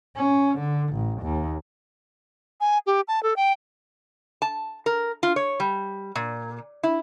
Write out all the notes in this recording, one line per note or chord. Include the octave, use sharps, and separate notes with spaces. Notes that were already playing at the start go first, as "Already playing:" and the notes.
C#4
D3
A1
D#2
G#5
G4
A5
A4
G5
A5
A#4
F4
C#5
G3
A#2
E4